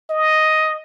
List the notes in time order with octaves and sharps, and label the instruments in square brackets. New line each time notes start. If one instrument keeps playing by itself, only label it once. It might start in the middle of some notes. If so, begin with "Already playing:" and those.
[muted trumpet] D#5